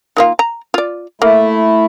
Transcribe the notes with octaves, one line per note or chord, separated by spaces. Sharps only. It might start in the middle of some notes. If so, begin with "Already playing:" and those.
D#3 A#3 F4
A#5
F4 D5
A3 A#3 E4